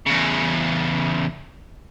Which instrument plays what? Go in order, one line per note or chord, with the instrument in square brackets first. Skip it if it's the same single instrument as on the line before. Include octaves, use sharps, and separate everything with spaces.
[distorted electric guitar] E2 C#3